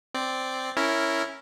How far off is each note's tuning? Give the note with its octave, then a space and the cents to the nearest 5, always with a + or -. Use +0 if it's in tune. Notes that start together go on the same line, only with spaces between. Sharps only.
C4 -5 D5 +0
C#4 +0 E4 +0 A#4 -10